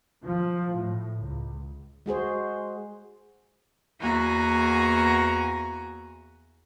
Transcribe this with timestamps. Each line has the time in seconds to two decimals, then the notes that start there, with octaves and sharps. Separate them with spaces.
0.25 F3
0.77 A2
1.21 C#2
2.06 G#3 F#4 G#4 C5
3.98 E2 A#3 F#4 G#5 A#5